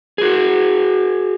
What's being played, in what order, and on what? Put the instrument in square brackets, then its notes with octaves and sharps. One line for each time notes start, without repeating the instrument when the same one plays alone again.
[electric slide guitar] F#4 G#4